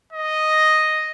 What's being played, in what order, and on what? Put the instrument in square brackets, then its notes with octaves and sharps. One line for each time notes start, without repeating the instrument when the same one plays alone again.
[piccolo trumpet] D#5